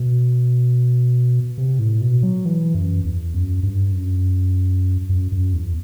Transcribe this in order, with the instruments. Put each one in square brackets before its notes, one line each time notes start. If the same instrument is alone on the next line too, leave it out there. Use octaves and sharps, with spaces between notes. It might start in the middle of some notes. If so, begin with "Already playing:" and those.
Already playing: [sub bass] B2
C3
A2
B2
F#3
E3
F#2
E2
F#2
G2
F#2
F#2
F#2
E2